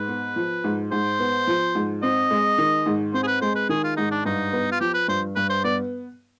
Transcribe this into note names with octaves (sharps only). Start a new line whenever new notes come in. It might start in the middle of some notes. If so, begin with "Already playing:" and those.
Already playing: G#2 B4
B3
F3
G#2
G#2 C5
B3
F3
G#2
C4 D#5
G#3
D#3
G#2
C4 C5
G#4
B4
G#3 C5
B4
D#3 G#4
F4
G#2 D#4
D4
G2 D#4
B3
F4
F3 G4
B4
G2 C5
G2 B4
C5
B3 D5